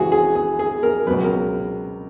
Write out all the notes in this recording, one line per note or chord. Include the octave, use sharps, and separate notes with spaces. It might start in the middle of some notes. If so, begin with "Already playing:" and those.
Already playing: C#2 C#3 E3 F#4 G#4
G#4
G#4
G#4
A#4
C#2 B2 F#3 B4
A#4